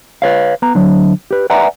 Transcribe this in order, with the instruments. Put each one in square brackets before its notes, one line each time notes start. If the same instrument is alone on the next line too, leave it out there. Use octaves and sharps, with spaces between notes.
[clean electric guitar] B4 C#5 F5
B3 A#5
D3 F#3
G4 B4
B4 D5 E5 F#5 G#5 A#5